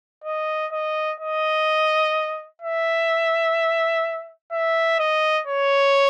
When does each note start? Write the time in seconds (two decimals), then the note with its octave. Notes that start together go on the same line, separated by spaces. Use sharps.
0.24 D#5
0.72 D#5
1.20 D#5
2.62 E5
4.52 E5
4.99 D#5
5.47 C#5